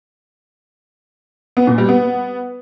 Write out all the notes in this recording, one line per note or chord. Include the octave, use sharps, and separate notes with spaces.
B3
A#2
G3
B3